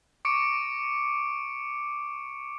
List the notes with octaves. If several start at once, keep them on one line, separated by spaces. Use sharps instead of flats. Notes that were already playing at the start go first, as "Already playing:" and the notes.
C#6 D6 C#7 D7